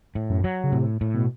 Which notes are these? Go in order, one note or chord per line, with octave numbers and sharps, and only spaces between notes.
A2
F#2
F#3
C#3
A2 C3
A2
B2